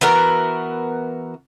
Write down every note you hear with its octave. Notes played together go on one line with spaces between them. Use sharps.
E3 B3 F#4 A#4